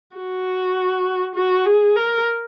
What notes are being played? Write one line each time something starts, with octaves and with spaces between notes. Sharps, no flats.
F#4
F#4
G#4
A#4